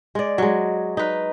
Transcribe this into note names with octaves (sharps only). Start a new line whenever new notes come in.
G#3 D5
F#3 G#3
D#4 B4